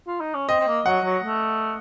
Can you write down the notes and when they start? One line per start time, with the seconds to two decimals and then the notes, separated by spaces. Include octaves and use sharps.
0.07 F4
0.21 D#4
0.35 C#4
0.49 C4 D#5
0.60 C4
0.67 A#3
0.86 F#3 F#5
1.05 F#3
1.23 A3